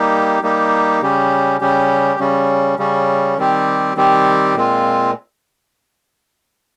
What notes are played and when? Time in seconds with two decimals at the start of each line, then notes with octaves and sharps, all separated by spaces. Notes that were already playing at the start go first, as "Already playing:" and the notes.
Already playing: G3 A#3 D#4 G4
0.43 G3 A#3 D#4 G4
1.02 C#3 G3 C#4 G4
1.61 C#3 G3 C#4 G4
2.19 C#3 G3 C#4
2.78 C#3 G3 C#4
3.37 D#3 G3 C4 G4
3.96 D#3 G3 C4 G4
4.55 A#2 G#3 C4 F4